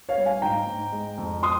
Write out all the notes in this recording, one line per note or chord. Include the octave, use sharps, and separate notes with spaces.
C#5 F5
G3
F5 G#5
G#2 G5 A#5
G#2
G#3
F2
F3 C6 D#6